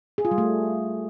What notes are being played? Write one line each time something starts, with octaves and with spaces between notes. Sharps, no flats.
G#4
F4
G3
A3